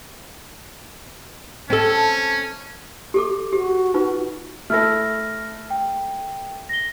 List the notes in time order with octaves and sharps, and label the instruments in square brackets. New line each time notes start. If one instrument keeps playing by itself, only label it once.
[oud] C4 A4 [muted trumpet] C#4
[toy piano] G4 A4 D6
[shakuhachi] F#4 [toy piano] G4
[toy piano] D#4 F4 B4
[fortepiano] A3 E4 A4 [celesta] F6 A#6
[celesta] G5
A#6 G7